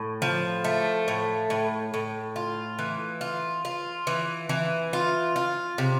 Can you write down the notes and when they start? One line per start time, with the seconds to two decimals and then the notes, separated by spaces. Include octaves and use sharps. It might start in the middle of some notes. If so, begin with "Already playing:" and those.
Already playing: A2
0.22 F3
0.64 A3
1.08 A2
1.50 A2
1.94 A2
2.36 F4
2.79 E3
3.21 F4
3.65 F4
4.07 E3
4.49 E3
4.93 F4
5.36 F4
5.78 C3